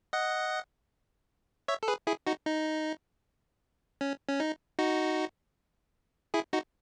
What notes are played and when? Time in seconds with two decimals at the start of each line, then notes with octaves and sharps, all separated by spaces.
0.13 D#5 F#5
1.68 C#5 E5
1.83 A4
1.88 G#4 B4
2.07 E4 G#4
2.27 D#4 F#4
2.46 D#4
4.01 C#4
4.29 C#4
4.40 D#4
4.79 D#4 F#4
6.34 E4 G#4
6.53 D#4 F#4